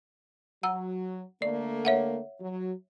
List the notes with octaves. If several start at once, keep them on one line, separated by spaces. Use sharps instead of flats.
F#3 F#5 A#5 E6
D3 A3 A#3 D5
C#5 E5 F#5
F#3